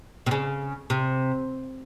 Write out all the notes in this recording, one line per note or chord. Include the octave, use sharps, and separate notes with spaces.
C3
C#3
C3